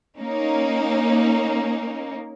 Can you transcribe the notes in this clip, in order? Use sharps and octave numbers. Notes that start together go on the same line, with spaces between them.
A#3 C#4 D#4